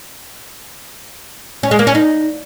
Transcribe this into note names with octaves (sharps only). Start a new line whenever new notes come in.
C#4
G#3
A#3
C#4
D#4